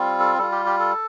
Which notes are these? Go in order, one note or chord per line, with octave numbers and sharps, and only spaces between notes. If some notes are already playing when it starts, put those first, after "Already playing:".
Already playing: G3 C4 F4
A4
G3 F4 A4
G4
G4
A4